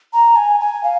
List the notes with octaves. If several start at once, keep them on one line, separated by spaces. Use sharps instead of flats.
A#5
G#5
G#5
F5